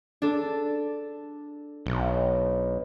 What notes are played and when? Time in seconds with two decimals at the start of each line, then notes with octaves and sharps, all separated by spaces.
0.22 D4 A4
1.86 B1